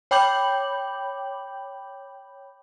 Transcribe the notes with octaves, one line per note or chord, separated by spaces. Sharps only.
C#5 G5 B5 D6 G6 F#7